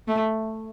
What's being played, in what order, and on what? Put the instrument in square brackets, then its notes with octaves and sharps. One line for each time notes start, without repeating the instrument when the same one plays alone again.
[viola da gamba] A3